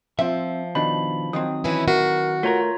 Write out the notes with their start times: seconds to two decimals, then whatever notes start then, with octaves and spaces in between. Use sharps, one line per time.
0.19 F3 C4 E5
0.75 B2 D#3 D4 B5
1.33 D#3 F#3 C4 D#6
1.64 E3 C#4 E4
1.88 F#4 A#4
2.43 A3 F4 A#4 C#5 A#5